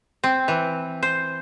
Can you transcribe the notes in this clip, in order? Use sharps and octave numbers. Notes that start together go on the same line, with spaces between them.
C4
E3
C5